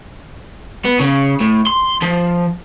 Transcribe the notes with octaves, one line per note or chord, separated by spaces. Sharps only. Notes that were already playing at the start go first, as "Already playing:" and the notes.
B3
C#3
A2
C6
F3